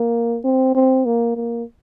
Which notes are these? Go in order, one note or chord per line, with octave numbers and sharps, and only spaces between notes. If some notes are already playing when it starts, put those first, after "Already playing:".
Already playing: A#3
C4
C4
A#3
A#3